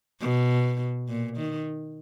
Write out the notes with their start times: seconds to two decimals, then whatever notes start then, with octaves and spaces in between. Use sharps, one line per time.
0.21 B2
1.09 A#2
1.37 D#3